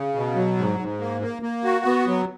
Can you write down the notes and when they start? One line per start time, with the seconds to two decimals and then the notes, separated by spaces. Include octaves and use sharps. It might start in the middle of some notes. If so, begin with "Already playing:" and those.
Already playing: C#3
0.15 B2
0.35 F#3
0.57 G#2
0.79 G#2
1.00 A#3
1.22 A#3
1.42 A#3
1.64 F#4
1.85 B3
2.07 F#3